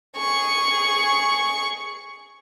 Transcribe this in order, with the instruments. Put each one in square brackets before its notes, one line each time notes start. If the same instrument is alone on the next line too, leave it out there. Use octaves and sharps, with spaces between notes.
[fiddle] G#4 C#6